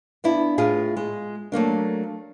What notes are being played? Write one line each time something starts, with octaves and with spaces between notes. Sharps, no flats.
B3 D4 E4
A2 F4 G#4
G#3
F#3 A3 A#3 D4